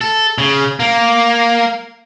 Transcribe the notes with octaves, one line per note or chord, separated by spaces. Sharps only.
A4
C#3
A#3